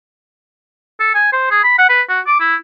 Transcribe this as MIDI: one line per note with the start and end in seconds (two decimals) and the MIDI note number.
1.00 1.10 69
1.14 1.29 80
1.33 1.46 72
1.51 1.62 68
1.64 1.73 83
1.78 1.88 78
1.89 2.02 71
2.09 2.20 66
2.27 2.36 86
2.40 2.55 64